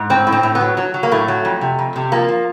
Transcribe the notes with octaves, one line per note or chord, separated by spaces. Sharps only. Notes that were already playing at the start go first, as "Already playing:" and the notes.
Already playing: G#2
A2 C4
A2
C4
A2
B3
F#3
F#3
F#3
A#3
A2 A3
F#3
F2
C3
F2
C3
F3 A#3
F3